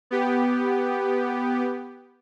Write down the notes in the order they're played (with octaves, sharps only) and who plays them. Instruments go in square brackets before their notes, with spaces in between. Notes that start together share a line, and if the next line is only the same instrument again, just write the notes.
[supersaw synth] B3 G4